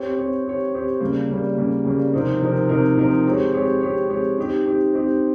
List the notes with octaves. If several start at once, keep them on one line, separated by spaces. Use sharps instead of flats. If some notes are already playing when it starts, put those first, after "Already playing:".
Already playing: C4 G4 C#5
C4 G4 C#5
C4 G4 C#5
C4 G4 C#5
C#3 G3 A#3
C#3 G3 A#3
C#3 G3 A#3
C#3 G3 A#3
C3 F3 C4 D#4 A#4
C3 F3 C4 D#4 A#4
C3 F3 C4 D#4 A#4
C3 F3 C4 D#4 A#4
G#3 C4 G4 C#5
G#3 C4 G4 C#5
G#3 C4 G4 C#5
G#3 C4 G4 C#5
C4 D#4 G4
C4 D#4 G4
C4 D#4 G4